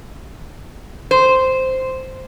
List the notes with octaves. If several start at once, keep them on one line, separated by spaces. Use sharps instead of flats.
C5